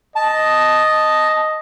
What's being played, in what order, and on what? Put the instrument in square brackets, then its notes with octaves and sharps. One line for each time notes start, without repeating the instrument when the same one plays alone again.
[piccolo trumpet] D#5 [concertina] A5